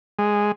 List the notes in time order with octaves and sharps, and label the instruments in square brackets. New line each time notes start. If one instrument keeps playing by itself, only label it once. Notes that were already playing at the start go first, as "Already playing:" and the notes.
[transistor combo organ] G#3